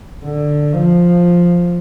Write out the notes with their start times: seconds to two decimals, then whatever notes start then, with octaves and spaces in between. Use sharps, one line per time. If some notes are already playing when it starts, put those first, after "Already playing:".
0.23 D3
0.73 F3